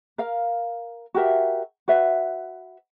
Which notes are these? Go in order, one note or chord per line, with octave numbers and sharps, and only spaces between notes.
A#4 F5
F#4 G4 A#4 E5
F#4 B4 E5